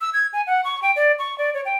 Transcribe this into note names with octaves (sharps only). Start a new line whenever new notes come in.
E6
G#6
G#5
F#5
C#6
G5
D5
C#6
D5
C#5
G5